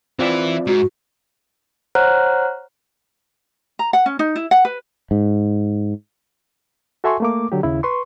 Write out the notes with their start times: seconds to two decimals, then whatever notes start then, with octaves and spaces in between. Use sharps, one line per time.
0.19 E3 C4 E4 F4 D5
0.67 G#2 F#4
1.95 C5 C#5 F#5 A#5 F6 F#6
3.79 A#5
3.93 F#5
4.06 C#4
4.19 D#4
4.36 E4
4.51 F#5
4.65 B4
5.11 G#2
7.04 F#4 A4 E5 G#5 C6 C#6
7.20 A3 A#3 D6
7.52 D3 F#3 G4
7.63 D#2 C#3 E4
7.83 B4 C6 C#6